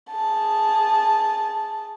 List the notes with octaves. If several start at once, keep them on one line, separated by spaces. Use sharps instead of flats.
G#4 A5